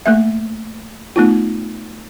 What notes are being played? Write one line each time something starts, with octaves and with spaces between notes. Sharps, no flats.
A3 A#3 E5
A3 B3 D#4 F4